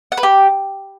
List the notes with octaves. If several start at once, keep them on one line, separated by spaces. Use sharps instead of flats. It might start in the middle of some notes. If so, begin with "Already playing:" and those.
F#5
B4
G4